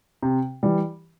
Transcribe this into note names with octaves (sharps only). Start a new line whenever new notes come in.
C3
E3 G3